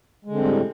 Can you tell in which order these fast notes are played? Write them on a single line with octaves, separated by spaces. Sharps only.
G#3 D3 C4 G3 A2